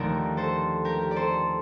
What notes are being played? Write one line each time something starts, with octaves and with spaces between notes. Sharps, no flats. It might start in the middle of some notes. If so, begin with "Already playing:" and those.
Already playing: D#2 D3 F3 A3 A#4 D5
A4 C5
G4 A#4
D5
A4 C5